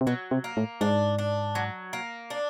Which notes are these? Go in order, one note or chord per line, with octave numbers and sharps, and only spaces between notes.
C3
B2 F#3
C3
A#3
A2
G#2 D4
D4
F#3
A#3
D4